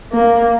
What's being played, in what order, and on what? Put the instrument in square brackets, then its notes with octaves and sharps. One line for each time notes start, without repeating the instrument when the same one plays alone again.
[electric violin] A#3